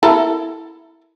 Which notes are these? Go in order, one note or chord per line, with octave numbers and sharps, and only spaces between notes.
E4 A4 A#4